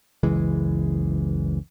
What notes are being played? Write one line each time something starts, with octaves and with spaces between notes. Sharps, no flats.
F#1 C#2 E3 G#3